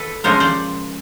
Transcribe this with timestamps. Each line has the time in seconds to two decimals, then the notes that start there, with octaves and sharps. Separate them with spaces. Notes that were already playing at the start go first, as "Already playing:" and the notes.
Already playing: A4 B4
0.24 C#3 F3 G#3 C#4 A#4 C5
0.40 C5 D5